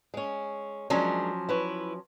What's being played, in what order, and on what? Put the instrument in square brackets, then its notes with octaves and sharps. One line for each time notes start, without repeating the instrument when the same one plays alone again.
[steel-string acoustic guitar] G#3 C#4
[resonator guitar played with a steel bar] F3 F#3 C#4 [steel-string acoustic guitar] G#3 D4 A#4
[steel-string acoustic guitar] E4 B4 C#5